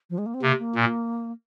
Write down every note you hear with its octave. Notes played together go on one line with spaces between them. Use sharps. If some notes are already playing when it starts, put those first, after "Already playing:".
F3
G#3
A#3
C4
C3 A#3
A#3
A#2